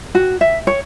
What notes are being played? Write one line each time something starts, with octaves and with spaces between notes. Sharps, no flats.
F#4
E5
C#5